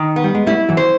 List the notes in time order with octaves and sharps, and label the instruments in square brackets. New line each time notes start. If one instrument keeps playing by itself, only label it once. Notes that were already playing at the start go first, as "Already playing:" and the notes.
Already playing: [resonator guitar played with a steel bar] D#3
B3
[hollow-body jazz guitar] G3
G#3
[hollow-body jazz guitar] G3 A3 [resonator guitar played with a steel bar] E4
[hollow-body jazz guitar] E3 F#3
[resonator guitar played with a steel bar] C5